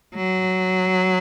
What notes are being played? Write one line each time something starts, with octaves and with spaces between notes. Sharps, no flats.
F#3